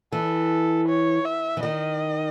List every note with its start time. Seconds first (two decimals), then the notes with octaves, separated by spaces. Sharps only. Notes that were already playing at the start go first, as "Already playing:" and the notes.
0.12 E3 A4
0.88 C#5
1.25 E5
1.57 E3
1.63 D#3 D#5